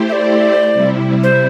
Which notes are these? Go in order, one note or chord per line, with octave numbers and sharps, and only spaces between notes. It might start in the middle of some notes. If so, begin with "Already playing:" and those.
Already playing: A3 E4 G4 C5
E5
D5
C3 G3 E4
C5